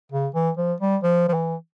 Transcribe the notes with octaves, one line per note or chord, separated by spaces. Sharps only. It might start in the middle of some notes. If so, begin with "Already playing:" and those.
C#3
E3
F3
G3
F3
F3
E3